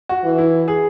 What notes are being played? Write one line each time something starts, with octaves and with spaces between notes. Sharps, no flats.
F#4
E3
E4
G#4